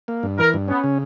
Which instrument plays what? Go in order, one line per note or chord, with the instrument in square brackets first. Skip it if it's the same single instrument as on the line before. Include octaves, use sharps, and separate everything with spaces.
[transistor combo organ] A#3
G2
[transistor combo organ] E3 [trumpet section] A#4
[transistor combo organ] G2
[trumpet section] B3 [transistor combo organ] C#4
[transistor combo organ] C#3